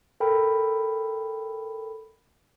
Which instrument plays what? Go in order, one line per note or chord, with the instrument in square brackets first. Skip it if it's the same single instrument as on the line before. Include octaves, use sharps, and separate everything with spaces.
[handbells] A4 A#4 G5 B5